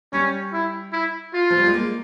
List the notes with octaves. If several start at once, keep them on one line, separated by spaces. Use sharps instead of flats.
G3 C#4
E4
E4
F4
F3
G3
G#3
A#3